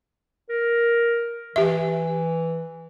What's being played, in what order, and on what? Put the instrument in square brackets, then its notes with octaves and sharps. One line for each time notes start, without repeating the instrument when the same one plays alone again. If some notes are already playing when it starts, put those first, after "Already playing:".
[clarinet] A#4
[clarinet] E3 [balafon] G4 E5